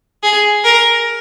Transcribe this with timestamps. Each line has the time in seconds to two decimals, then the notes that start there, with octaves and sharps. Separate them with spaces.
0.23 G#4
0.64 A#4